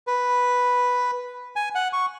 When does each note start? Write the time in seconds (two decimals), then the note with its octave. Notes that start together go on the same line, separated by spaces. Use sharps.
0.07 B4
1.56 G#5
1.75 F#5
1.93 C#6